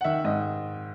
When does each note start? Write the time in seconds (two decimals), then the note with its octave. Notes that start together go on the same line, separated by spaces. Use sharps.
0.01 F#5
0.04 D#3 E5
0.24 G#2 D#5